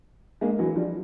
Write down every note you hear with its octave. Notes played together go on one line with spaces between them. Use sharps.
G#3 A#3
E3 F#3
F3 G3